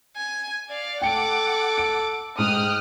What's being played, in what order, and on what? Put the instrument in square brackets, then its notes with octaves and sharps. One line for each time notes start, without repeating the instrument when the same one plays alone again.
[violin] G#5
D5 F5
[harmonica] A4 [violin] F#5 D6 [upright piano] G5 C#7 D7
[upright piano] D7
[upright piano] G#2 [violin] G5 F#6 [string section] D#6 F6